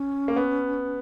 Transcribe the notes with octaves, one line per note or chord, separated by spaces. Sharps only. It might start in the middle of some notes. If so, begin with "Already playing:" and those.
Already playing: C#4
A#3
B3